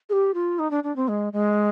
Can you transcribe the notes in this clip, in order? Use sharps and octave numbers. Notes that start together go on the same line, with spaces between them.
G#4
G4
F4
D#4
D4
D4
C4
G#3
G#3